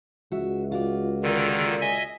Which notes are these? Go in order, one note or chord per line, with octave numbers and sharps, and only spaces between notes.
C#2 F#4 E5
F4 F#4 D5
A#2 D3 D#3
D#5 E5 G#5